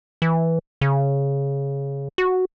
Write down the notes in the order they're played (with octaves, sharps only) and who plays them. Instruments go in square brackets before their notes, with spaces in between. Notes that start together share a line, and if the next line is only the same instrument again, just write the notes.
[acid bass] E3
C#3
F#4